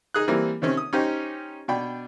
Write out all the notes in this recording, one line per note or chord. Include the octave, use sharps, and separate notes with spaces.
D#4 G#4 D#6 F#6
E3 G3 A#3 C4
C3 D#3 C4 C#4
D#6
C#4 D#4 G4 C5
B2 D4 G5 B5